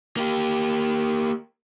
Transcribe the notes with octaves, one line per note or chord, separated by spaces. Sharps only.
A#3 G4